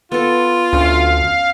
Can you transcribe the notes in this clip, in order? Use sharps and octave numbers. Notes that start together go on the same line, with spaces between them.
B3 F4 A4
D2 C#4 F5